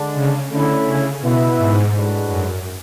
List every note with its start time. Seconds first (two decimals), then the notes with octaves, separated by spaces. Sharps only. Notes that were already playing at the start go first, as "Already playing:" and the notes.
Already playing: D3 G#3 D4
0.15 C#3
0.50 D3 A3 C#4 E4
0.86 C#3
1.21 B2 B3 E4 B4 E5
1.57 G#2
1.92 A2 G#3 D4 F#4 B4
2.28 F#2